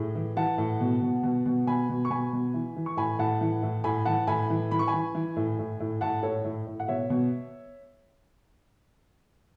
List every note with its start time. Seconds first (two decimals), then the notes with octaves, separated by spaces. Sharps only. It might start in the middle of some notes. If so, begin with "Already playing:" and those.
Already playing: A2 G#4
0.15 E3
0.36 E3 F#5 A5
0.58 A2
0.80 B2
1.02 B2
1.23 B2
1.46 B2
1.67 B2 G#5 B5
1.89 B2
2.05 C#6
2.10 B2 G#5 B5
2.33 B2
2.54 E3
2.76 E3
2.86 C#6
2.97 A2 G#5 B5
3.19 A2 F#5 A5
3.41 E3
3.63 A2
3.84 A2 G#5 B5
4.05 E3 F#5 A5
4.27 A2 G#5 B5
4.50 E3
4.71 E3 B5
4.79 C#6
4.88 G#5 B5
4.94 E3
5.15 E3
5.36 A2
5.59 A2
5.80 A2
6.01 A2 F#5 A5
6.23 A2 A4 C#5
6.44 A2
6.67 A2
6.80 F#5
6.88 B2 C#5 E5
7.10 B2